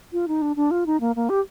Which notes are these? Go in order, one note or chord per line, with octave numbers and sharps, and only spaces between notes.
F4
D#4
D4
D4
F4
D#4
A#3
A#3
G4